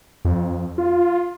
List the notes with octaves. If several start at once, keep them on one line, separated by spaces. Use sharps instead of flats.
F2
F4